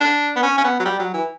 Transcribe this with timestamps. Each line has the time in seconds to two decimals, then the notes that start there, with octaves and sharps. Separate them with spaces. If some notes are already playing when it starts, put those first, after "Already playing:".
0.01 D4
0.36 B3
0.43 C#4
0.58 C#4
0.64 B3
0.80 F#3
0.85 G3
0.99 F#3
1.14 E3